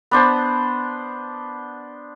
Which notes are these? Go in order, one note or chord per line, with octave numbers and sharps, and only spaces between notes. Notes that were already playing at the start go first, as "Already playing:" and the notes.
B3 D4 C5 A5